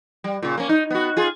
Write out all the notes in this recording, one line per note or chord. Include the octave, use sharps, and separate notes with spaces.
G3
A#2 C#3
A#3 C#4
D#4
B3 F#4
F4 G#4